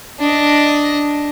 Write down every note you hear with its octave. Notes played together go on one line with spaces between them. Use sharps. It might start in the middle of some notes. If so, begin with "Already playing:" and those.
D4 D#5